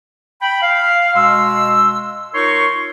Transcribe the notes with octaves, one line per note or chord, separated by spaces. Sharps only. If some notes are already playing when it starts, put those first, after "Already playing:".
G5 B5
F5
B2 G#3 C6 E6
D#4 F4 A#4 C#5 C6 C#6